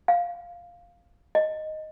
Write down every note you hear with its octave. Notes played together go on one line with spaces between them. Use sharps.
F5
D#5